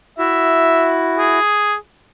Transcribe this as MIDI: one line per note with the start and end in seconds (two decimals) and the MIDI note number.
0.19 1.39 64
0.19 1.39 66
0.19 0.93 76
1.19 1.75 68